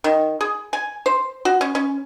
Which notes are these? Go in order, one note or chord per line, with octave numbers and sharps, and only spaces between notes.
D#3
G#4
G#5
C5
F#4
C#4
C#4